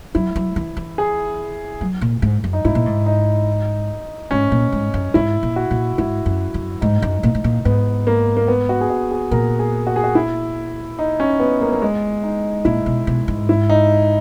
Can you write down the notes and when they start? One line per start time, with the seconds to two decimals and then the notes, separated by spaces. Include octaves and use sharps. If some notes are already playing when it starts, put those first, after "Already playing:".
0.15 F#3 E4
0.36 F#3
0.56 E3
0.77 E3
0.98 G#4
1.81 F#3
2.01 A#2
2.22 G#2
2.44 F#2
2.53 D#4
2.65 G#2 E4
2.75 A#2
2.86 G#2
3.06 D#4
4.31 G#2 C#4
4.52 A#2
4.72 G#2
4.94 F#2
5.14 G#2 E4
5.43 A#2
5.56 F#4
5.71 A#2
5.98 G#2 E4
6.26 F#2
6.54 F#2
6.81 G#2 D#4
7.02 F#2
7.23 A#2
7.35 G#2
7.44 A#2
7.65 G#2 B3
8.07 A#3
8.37 A#3
8.48 B3
8.69 F#4
8.81 G#4
8.90 F#4
9.11 G#4
9.31 A#2 A#4
9.59 G#4
9.87 F#4
9.96 G#4
10.04 F#4
10.15 E4
10.99 D#4
11.20 C#4
11.40 B3
11.61 A#3
11.72 A#3
11.82 G#3
12.23 D#4
12.65 A#2 E4
12.86 B2
13.07 B2
13.28 G#2
13.49 E4
13.70 D#4